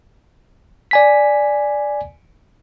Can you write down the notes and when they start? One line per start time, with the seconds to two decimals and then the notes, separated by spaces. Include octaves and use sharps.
0.91 D5 G#5 B6